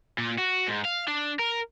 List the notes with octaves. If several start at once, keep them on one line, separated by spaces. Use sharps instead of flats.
A#2
F#4
G#2
F5
D4
A#4